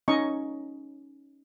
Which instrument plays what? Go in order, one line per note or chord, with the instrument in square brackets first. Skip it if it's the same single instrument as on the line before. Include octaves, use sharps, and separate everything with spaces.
[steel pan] C#4 D#4 D#5 A#5 C#6